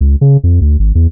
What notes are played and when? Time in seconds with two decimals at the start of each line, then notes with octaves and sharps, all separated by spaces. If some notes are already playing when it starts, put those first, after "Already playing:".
0.01 C#2
0.21 C#3
0.44 F2
0.61 D2
0.79 G#1
0.95 E2